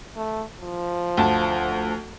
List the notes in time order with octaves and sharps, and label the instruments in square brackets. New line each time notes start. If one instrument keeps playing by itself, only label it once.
[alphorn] A3
F3
[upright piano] D2 A5